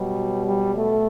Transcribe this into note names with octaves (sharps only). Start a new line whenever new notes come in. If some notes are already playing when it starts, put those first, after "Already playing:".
Already playing: B2 F#3 G3
G3
A3